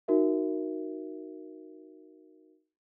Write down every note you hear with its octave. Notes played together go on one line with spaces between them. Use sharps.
D#4 F#4 A#4 E5